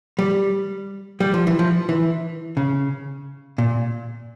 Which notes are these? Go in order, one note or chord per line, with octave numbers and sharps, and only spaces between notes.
G3
G3
F3
E3
F3
E3
C#3
A#2